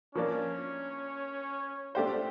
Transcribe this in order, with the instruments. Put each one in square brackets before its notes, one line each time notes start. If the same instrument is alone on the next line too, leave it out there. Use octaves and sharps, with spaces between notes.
[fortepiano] F3 A#3 D4 [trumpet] C#4
[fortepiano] A3 D4 G4 C5 [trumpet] F4